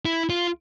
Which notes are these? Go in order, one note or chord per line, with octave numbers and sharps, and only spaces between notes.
E4
F4